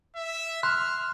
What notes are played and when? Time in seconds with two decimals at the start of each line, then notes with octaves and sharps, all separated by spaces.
0.16 E5
0.63 C6 F6 F#6